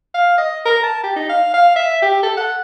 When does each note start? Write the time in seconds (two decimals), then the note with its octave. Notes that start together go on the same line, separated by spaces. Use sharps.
0.14 F5
0.38 D#5
0.65 A#4
0.83 A5
1.04 G4
1.16 D#4
1.29 F5
1.54 F5
1.76 E5
2.02 G4
2.23 A4
2.37 F#5